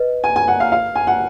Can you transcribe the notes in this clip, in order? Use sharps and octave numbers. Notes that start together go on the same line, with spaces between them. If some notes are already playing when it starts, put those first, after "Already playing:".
Already playing: B4 D#5
G#5
G#5
F#5
F5
F5
G#5
F#5